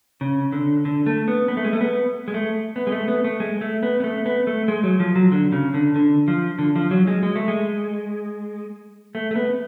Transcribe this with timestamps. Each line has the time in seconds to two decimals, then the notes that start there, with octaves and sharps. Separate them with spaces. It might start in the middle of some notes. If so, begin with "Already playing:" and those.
0.21 C#3
0.52 D3
0.85 D3
1.06 A3
1.28 B3
1.48 B3
1.57 A3
1.65 G#3
1.73 A3
1.81 B3
2.28 G#3
2.34 A3
2.76 B3
2.87 G#3
2.92 A3
3.08 B3
3.24 A3
3.40 G#3
3.61 A3
3.83 B3
4.00 B3
4.04 A3
4.26 B3
4.47 A3
4.68 G#3
4.84 F#3
5.00 F3
5.15 F#3
5.32 D3
5.52 C#3
5.74 D3
5.96 D3
6.28 F3
6.59 D3
6.76 F3
6.91 F#3
7.07 G#3
7.23 G#3
7.36 A3
7.48 G#3
9.15 A3
9.31 A3
9.36 B3